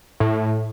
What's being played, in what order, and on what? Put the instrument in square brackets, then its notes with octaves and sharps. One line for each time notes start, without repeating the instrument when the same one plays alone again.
[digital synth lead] A2